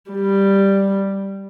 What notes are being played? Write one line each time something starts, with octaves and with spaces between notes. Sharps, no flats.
G3